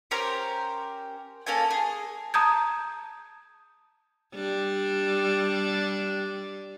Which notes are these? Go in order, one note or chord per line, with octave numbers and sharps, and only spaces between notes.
C#4 G4 A#4 C5
A#3 C#4 A4 G#5
G#4
A5 A#5 D#6 G6 G#6
G3 D4